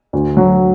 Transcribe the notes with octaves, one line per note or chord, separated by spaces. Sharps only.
D2
F#3